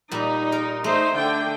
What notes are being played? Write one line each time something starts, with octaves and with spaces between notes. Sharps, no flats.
A#2 G3 D#4
A#4
A3 D#4 C5
D3 G5